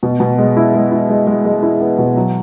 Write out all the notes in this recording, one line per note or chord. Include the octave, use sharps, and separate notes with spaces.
B2
B2
G#3
E4
G#3
E4
G#3
G#3
G#3
E4
B3
B2
F#3